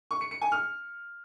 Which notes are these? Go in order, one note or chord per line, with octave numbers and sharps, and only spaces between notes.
C#6
C#7
C#7
G#5
F6